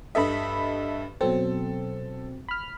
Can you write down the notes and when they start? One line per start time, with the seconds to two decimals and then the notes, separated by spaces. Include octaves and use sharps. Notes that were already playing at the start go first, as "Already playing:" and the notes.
0.15 G2 A4 D#5 E5 B5
1.21 B2 F#3 C4 A4
2.48 B5 F6